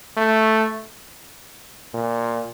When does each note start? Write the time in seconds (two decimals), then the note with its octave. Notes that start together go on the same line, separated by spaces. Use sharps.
0.17 A3
1.94 A#2